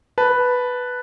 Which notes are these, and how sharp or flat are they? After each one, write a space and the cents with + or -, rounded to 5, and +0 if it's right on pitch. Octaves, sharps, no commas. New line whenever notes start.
B4 +0 A5 +0